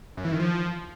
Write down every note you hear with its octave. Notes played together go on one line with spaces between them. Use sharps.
F#2
E3
D#3
F3